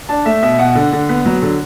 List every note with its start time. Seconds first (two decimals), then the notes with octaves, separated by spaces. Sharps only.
0.09 D4 A5
0.25 A3 E5
0.42 B2 E5
0.59 B2 F#5
0.75 D3
0.93 D3
1.09 B3
1.26 F#3
1.42 D3